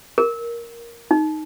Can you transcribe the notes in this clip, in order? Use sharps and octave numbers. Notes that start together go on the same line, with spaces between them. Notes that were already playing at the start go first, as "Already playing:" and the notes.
A#4
D#4